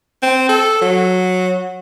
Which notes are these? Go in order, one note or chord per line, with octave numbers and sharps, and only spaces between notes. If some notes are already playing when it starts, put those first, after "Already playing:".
C4
A4
F#3